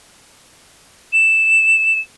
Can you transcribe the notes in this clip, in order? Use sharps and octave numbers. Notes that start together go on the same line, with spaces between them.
E7